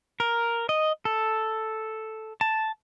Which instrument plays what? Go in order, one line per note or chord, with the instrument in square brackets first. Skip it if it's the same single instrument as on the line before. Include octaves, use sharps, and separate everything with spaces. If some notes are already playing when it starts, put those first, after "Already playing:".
[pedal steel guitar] A#4
D#5
A4
A5